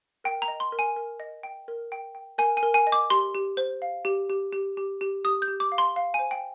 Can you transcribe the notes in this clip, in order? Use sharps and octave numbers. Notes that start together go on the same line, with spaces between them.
A#4 G5
A#5
D#5
C6
A#4
G#5
A#4
D#5
G5
A#4
G5
G5
A#4 G#5
G#5
A#4
G#5
D#5
D6
G4 C6
G4
C5
F5
G4
G4
G4
G4
G4
G4 D#6
G6
G4
D6
F5
C6
F5
G#5
C5
G5